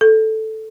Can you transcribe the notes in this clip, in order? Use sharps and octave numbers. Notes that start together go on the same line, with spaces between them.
A4